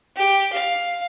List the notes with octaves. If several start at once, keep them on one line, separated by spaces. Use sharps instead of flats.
G4
F5